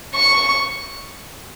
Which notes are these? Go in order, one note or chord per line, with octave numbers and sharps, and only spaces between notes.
C#6